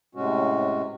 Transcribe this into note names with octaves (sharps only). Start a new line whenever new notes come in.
A2 C3 G#3 C#4 F#4